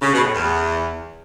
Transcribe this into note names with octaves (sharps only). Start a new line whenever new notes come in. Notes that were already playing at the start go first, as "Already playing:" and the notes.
C#3
B2
A2
E2